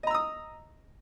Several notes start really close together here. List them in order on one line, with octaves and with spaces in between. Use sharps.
D#5 A#5 E6 D#6